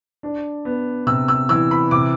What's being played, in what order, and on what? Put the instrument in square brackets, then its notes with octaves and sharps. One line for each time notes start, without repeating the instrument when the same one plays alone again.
[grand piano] D4
B3
C3 E6
E6
E3 E6
B5
C3 D6